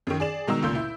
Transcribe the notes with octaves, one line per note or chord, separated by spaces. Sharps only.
F#2 D#3
G#4 D5 E7
B2 D#3 G#3 D#4 A#5 E6
F1 C#2 A#2 G6
E4